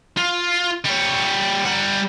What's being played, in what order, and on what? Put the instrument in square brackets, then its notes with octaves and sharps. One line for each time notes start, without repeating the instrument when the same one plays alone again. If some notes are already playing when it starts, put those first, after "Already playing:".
[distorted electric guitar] F4
G3 C#5
G3 F#5